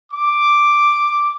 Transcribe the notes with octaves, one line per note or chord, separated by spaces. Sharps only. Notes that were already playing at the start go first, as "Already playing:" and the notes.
D6